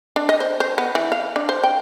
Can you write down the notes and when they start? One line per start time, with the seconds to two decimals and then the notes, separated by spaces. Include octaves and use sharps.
0.16 D4
0.29 D#5
0.40 C5
0.60 C5
0.78 B3
0.95 E3
1.12 F5
1.36 D4
1.49 C5
1.63 G5